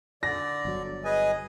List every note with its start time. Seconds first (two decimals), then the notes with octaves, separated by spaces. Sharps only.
0.23 D3 D5 A#6
0.65 G1 F#3
1.05 G#4 B4 D#5 G#5